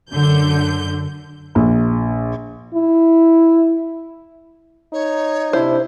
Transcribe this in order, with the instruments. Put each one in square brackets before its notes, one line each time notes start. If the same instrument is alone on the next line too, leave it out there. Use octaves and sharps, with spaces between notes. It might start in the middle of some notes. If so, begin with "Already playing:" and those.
[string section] F#2 D3 G6
[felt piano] A#1
[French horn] E4
[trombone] D#4 [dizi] C#5
[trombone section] C3 D4 E4 [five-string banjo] C5